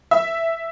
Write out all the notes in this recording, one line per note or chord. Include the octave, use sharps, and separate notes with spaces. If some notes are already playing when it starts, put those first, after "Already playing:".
E5